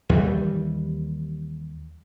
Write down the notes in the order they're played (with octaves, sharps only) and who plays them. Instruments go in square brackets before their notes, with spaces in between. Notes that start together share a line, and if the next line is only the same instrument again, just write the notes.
[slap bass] D#2 E3 G3